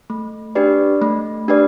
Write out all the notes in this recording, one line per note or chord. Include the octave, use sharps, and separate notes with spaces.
A3
D4 G4 B4 D5
A3
D4 G4 B4 D5